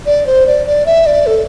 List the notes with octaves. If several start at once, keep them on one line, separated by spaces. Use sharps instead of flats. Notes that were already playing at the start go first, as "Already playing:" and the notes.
D5
C5
D5
D5
E5
D5
A4